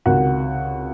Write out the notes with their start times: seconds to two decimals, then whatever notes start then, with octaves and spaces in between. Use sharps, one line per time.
0.06 C#2 C3 D#3 F#4